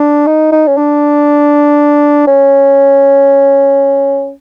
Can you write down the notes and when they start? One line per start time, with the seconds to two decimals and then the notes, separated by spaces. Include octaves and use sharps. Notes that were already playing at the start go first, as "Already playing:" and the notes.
Already playing: D4
0.27 D#4
0.52 D#4
0.67 C#4
0.77 D4
2.27 C#4